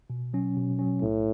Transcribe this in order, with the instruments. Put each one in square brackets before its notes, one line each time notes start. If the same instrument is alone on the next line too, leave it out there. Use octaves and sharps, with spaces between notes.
[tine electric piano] B2
F#3 C#4
B2
F#3 C#4
[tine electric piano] B1 [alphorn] A2